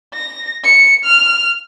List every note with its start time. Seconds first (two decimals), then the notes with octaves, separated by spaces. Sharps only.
0.14 A#6
0.64 C#7
1.05 F6